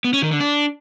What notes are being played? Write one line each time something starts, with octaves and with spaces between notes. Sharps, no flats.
B3
C#4
D#3
D3
D4